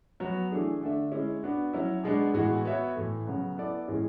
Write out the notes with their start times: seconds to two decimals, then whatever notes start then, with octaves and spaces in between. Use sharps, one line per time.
0.20 F#3 B3 F#4
0.51 E3 A3 D4 G#4
0.81 D3 A3 D4 A4 E5
1.12 G#3 C#4 E4
1.43 B3 D4 F#4
1.73 F#3 C#4 E4
2.04 B2 G#3 B3 D4
2.34 A2 E3 G#3 B3 F#4
2.65 B3 F#4 C#5 E5
2.96 A2 E3 A3
3.25 C#3 F#3 B3
3.57 B3 E4 A4 D5
3.88 A2 E3 G#3 C#4